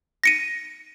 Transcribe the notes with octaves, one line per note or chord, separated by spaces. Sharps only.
A#6 C#7 D#7